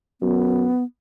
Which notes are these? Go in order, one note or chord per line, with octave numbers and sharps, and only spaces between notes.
F#2 B3